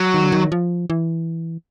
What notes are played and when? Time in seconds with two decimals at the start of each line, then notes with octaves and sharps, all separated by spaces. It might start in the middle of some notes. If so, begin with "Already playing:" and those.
Already playing: F#3
0.14 D#3
0.24 D3
0.32 D#3
0.52 F3
0.90 E3